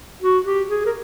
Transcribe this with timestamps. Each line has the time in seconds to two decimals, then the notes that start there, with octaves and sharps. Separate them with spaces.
0.23 F#4
0.45 G4
0.69 G#4
0.86 A#4